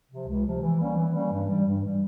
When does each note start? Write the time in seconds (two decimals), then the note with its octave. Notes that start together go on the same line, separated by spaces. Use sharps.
0.10 C3 F3
0.27 C#2
0.45 C3 F3
0.61 E3
0.79 G3 A#3 C#4
0.96 E3
1.14 G3 A#3 C#4
1.31 G2
1.48 E3 G3
1.65 G2
1.83 E3 G3